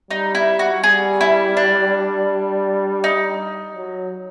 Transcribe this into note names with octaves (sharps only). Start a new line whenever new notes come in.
G3 D#4
E4
F#4
G3 G#4
E4
D4
D#4
F#3